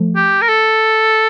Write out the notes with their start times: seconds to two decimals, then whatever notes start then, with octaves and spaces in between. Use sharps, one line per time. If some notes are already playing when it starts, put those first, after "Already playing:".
Already playing: F3 A3
0.16 G4
0.42 A#4
0.49 A4